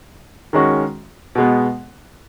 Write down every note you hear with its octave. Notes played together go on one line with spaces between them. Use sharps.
D#3 G#3 C#4 F#4
B2 G#3 B3